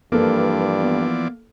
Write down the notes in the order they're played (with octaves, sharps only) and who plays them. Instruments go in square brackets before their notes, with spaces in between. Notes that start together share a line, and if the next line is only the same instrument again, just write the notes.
[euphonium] G2 [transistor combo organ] E3 F3 D5 [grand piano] A#3 A4 [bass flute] B4
[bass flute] B3